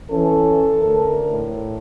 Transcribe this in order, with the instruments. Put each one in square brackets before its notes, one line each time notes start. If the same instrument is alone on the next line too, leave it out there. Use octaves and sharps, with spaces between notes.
[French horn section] E3 C#4 [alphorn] A4
[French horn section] D2 A#4
[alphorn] A2